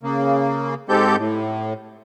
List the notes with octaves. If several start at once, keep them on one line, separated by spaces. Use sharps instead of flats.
C#3 A#3
G#2 G#3 C4 G4 A4 G6
A2